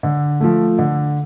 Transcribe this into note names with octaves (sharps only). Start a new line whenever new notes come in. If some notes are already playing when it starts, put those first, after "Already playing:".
D3
F3 A3
D3